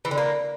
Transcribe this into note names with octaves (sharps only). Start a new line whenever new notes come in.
E3
D3
A#3